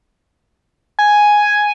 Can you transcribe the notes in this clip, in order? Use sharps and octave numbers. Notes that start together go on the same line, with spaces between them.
G#5